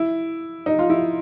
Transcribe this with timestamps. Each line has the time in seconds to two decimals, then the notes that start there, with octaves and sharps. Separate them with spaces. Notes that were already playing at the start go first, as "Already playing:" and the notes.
Already playing: E4
0.66 D#4
0.79 F4
0.90 E4